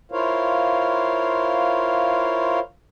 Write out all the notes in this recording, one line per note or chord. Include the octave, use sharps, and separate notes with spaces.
E4 F4 A#4 C5 C#5 F5